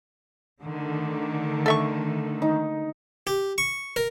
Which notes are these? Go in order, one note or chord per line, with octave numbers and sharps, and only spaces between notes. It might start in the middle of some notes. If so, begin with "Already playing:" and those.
D3 D#3 A3
A4 E5 C#6
D#4
G4
C#6
A#4